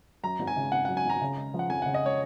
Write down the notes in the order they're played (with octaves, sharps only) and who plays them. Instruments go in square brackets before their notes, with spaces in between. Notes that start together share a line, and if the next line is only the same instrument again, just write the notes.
[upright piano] F#2 [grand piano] A#5
[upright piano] G#1
[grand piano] G#5
[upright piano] C#3
[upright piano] G#1 [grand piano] F#5
[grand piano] F#5
[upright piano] F#2
[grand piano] G#5
[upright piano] G#1 [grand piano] A#5
[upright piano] C#3
G#3
F3
[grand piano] F#5
[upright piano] F2 [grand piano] G#5
[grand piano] F#5
[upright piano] C#3
[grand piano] D#5
[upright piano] G#3 [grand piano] C#5